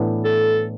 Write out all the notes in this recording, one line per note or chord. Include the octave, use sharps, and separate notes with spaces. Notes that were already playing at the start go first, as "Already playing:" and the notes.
Already playing: A2 E3 B3 D4
A4